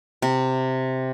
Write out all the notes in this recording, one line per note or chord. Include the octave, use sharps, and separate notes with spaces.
C3